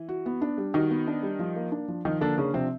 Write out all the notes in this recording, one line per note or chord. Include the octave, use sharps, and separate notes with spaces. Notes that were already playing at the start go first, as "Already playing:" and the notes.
Already playing: E3
F#4
B3
D4
G3
D#3 D#4 F#4
B3
D4
G3
F3
A#3
D4
F3
D#3 F3 D#4
D3 A#3 D4
C#3 C#4 D4
C3 F3 C4